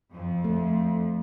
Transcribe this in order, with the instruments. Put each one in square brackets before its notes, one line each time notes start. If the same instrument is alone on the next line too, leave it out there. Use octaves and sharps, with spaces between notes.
[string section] F2
[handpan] A3